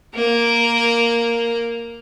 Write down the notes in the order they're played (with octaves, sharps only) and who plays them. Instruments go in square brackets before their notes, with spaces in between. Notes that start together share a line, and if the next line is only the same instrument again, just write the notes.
[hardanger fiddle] A#3 A#4